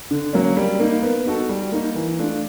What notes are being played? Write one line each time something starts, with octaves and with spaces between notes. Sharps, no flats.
D3
F#3 A#3 C#4
G3
A#3 D#4
B3
D#4 F#4 A4
G3
A#3 D#4
E3
A3 D4 F4